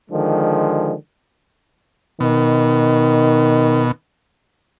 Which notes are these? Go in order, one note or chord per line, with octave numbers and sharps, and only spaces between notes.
D3 D#3 F3 G#3
B2 D#3